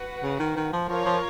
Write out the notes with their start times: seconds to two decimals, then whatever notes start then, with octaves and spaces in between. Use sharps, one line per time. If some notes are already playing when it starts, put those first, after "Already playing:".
Already playing: F#4 B4 F#5
0.23 C#3
0.39 D#3
0.56 D#3
0.73 F3
0.88 F3 F4 A#4 C#5
1.05 F3